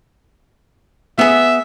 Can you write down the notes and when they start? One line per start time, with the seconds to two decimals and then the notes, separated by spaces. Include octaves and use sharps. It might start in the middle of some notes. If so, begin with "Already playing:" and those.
1.19 B3 G#4 E5